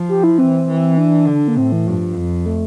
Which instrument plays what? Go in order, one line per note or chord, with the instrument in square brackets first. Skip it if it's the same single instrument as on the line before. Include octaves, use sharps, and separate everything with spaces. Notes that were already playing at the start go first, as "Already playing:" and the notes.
Already playing: [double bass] F3
[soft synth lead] G4
E4
[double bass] E3 [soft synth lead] C4
[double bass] E3
[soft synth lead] D4
[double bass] D3
[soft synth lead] A#3
[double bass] A2 [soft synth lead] C4
[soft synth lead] E3
[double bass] G2 [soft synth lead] F3
[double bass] F2
[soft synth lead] A3